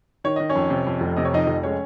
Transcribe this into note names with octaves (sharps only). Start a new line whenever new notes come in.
D#3 C#5
D#3 D#5
C#4 C#5
F2
C3
F2
F1
C3 D#5
C#5
F2 D#4 D#5
F1
G#3 C#4 C#5